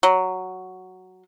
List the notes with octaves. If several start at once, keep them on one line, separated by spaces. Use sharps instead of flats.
F#3